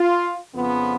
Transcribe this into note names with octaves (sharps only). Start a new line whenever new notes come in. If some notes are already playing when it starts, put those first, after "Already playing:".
Already playing: F4
F2 C#3 F3 B3